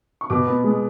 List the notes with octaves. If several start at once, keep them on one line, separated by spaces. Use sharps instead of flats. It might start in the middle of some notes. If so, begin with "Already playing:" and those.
C#6
B2 D6
B3
G#3